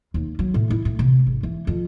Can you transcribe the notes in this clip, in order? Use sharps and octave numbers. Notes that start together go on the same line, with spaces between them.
D#2
F#3
A2
E4
A2
C3
G#1
E3
F2